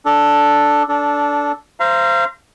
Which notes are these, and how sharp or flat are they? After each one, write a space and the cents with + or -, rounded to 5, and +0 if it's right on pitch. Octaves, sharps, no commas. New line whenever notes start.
D4 +0 A4 +0
D4 -15 A4 +0
C5 +0 F5 -35 A#5 +0